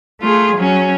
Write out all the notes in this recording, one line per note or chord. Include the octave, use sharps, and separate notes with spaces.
A3 F4 G#4
F#3 C#4